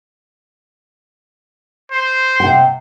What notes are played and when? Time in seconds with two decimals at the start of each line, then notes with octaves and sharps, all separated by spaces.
1.92 C5
2.40 C3 F#5 G5